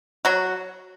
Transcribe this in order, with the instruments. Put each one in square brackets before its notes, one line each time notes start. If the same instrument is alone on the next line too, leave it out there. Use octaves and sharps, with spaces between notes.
[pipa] F#3 F#4